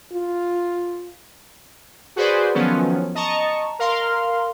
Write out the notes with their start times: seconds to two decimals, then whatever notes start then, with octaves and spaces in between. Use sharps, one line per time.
0.13 F4
2.16 F#4 G#4 B4 C5 D5
2.54 D#3 F3 F#3 B3 C#4 A4
3.15 D#5 A5 A#5 C#6
3.79 A#4 F5 C6